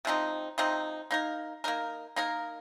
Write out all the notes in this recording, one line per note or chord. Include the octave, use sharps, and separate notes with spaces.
C3 F3 C4 D#4
C3 F3 C4 D#4
A#3 D#4 A#4
A#3 D#4 A#4
A#3 D#4 A#4